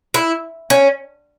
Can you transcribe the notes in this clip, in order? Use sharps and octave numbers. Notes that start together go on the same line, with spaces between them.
E4
C#4